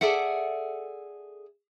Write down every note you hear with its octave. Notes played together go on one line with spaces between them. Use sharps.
G#4 A4 D5 E5 F#5